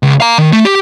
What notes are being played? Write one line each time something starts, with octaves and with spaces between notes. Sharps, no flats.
C#2
F5 A#5
D#3
A3
G4